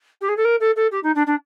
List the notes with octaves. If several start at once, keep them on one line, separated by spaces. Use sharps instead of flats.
G4
G#4
A4
A#4
A4
A4
G4
D#4
D4
D4